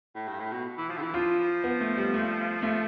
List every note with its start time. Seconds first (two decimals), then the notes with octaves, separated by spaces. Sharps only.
0.15 A2
0.28 G2
0.40 A2
0.52 B2
0.78 E3
0.90 F3
0.97 D3
1.02 E3
1.14 F3 F4
1.64 B3
1.81 A3
1.97 G3
2.14 A3
2.62 A3